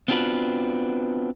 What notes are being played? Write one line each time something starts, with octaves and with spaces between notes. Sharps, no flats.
B3 C4 D4 F4 F#4 B4